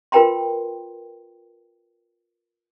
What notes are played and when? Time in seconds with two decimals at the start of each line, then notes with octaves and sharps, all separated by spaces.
0.12 F4 A#4 B4 G5 A#5 C6